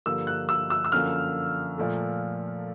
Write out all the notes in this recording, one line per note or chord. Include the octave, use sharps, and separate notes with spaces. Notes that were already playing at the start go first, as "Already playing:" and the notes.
G2 D3 F3 A#3 E6
F#6
E6
E6
E6
F#2 D3 F3 A#3 F6
A#2 F3 A3